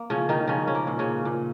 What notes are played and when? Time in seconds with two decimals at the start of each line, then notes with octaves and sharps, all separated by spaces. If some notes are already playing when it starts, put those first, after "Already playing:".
Already playing: A#3
0.10 C#3 F3 C#4
0.29 D#3 D#4
0.48 C#3 F3 C#4
0.67 C#4
0.75 A#3
0.87 A#2
0.99 C#3 C#4
1.25 A#2